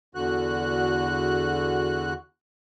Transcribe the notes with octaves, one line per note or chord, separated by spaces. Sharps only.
E2 D3 F#4 F#6